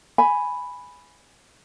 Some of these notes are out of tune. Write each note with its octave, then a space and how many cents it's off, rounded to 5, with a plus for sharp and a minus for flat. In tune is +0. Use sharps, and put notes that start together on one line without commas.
G#5 +0 B5 +0